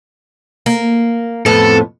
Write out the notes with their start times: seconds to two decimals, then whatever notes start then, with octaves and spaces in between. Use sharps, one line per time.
0.66 A#3
1.46 F2 A2 B3 A4